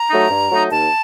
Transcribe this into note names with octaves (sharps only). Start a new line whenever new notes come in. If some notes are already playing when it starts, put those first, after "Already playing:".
Already playing: A#5
F#3 A3 D#4
G2
F#3 A3 D#4
D#2 A5